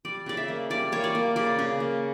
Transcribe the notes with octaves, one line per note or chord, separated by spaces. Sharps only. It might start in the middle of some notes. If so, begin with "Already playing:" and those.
G3 D5
C#3 D5
E5
A#3
G3 D5
A#3 C#5
D5
A#3
C#3 D5
C#3
A#3